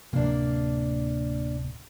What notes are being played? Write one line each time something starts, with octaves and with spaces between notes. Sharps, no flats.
D1 C3 A#3 D4